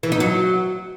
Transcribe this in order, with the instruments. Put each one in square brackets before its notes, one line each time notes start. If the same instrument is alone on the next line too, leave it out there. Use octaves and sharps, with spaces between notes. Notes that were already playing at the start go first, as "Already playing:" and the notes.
[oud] E3
D#4
F#3